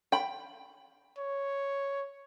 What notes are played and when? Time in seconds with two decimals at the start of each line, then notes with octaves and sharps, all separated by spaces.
0.12 G5 B5
1.18 C#5